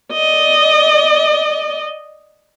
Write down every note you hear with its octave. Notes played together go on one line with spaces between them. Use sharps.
D5 D#5